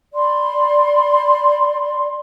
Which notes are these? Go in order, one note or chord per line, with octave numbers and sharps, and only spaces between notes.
D5 B5 C6